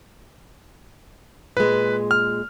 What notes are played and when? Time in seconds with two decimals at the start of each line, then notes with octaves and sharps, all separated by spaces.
1.57 A#2 G#3 B4
2.11 F6